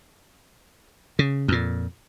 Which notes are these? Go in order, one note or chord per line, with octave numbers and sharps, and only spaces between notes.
C#3
F2 A#2